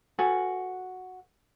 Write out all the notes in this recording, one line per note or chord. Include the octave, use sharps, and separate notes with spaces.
F#4 A4 B4 G#5